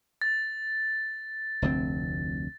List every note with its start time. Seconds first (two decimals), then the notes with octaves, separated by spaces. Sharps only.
0.22 A6
1.62 F1 D2 C4